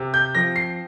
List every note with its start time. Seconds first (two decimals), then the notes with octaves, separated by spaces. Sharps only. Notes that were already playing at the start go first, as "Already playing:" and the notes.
Already playing: C3
0.14 G6
0.35 F3 C4 A#6
0.56 C7